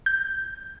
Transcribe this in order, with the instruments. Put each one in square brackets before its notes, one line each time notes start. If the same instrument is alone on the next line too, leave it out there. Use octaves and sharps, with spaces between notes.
[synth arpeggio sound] G6